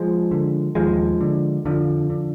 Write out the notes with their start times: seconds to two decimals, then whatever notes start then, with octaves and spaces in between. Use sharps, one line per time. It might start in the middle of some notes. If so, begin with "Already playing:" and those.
Already playing: F3 G#3
0.31 D3
0.75 D#2 F3 G#3
1.21 D3
1.65 F2 D3 F3
2.10 D3